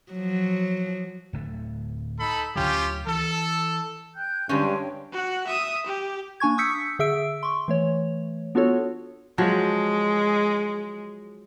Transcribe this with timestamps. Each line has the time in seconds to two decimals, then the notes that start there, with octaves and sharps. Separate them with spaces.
0.12 F3 F#3
1.33 D1 D3 A3
2.19 D#4 A4 B5
2.56 D2 D3 F#3 C#4 F4 G4
3.07 E3 A4
4.15 G5 F#6 G6
4.49 G2 D3 G#3 C#4 C#5 G5
5.12 F#4 F#5
5.47 E5 D#6
5.86 G4
6.40 A#3 D4 G#5 C#6 G#6
6.58 C#6 D#6 E6 G6 B6 C#7
6.99 D3 G#4 E5 E6 D7
7.43 C6 C#6
7.68 E3 A3 C#5
8.55 B3 D4 F4 F#4 A4 C#5
9.38 F3 F#3 G#3